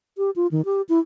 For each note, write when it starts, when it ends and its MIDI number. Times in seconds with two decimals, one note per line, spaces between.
0.18 0.30 67
0.36 0.47 65
0.51 0.61 51
0.65 0.82 67
0.89 0.99 64